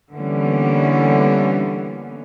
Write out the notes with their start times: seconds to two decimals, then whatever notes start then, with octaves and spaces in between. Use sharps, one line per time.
0.14 D3 E3 G3 A#3 B3 C#4